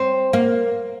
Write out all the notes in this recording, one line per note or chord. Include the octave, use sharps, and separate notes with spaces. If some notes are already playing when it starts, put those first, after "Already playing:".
Already playing: C4
A#3